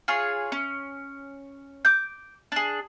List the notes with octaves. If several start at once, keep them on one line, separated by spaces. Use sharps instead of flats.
F4 G#4 C#5
C#4
D6 G6
D4 G#4